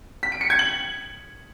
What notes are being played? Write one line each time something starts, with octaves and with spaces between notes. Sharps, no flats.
B6
D7
C#7
G#6
F#7